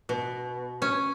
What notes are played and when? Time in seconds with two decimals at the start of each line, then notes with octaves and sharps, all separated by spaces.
0.09 B2
0.82 C#4